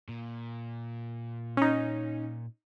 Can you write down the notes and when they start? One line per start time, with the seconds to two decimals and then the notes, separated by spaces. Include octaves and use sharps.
0.09 A#2
1.57 C#4 D#4